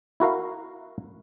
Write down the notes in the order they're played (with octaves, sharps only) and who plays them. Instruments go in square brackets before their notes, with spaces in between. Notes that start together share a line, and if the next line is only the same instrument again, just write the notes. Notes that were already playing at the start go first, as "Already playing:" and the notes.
[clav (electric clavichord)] E4 F#4 A#4 F5